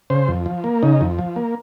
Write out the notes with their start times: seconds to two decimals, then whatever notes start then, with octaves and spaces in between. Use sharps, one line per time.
0.10 C#3 C5
0.28 F2
0.46 F3
0.64 A#3
0.83 C#3 D#4
1.01 F2
1.19 F3
1.36 A#3